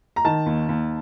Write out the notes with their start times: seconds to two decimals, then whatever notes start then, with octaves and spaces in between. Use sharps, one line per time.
0.16 A#5
0.25 D#3 A5
0.46 D#2
0.69 D#2